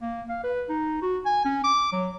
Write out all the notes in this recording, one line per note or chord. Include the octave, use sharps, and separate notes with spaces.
A#3
F5
B4
D#4
F#4
G#5
C#4
D6
F#3